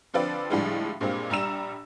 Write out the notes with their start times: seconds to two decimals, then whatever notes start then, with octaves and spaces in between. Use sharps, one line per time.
0.14 D3 F3 C4 B4 D5
0.50 A2 D3 F3 G3 G#3
1.00 G2 A#2 G#3 A#3 C4
1.30 A#1 G3 A#5 E6 E7